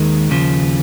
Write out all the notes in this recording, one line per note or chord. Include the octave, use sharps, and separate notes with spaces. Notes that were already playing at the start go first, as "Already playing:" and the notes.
Already playing: D#2 D#3 G#3
D#2 C#3 F3